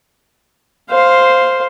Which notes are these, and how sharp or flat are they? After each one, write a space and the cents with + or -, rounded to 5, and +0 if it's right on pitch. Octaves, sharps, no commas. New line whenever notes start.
C5 +0 F5 +0